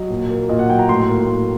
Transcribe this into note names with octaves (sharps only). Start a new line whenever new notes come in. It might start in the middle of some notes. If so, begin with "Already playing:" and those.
Already playing: F#3 D#5
A#2
A#3
A#2 D#5
F#5
F#3 G5
A#5
A2 C6
A#3
A2